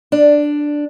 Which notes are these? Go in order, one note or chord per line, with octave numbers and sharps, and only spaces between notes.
D4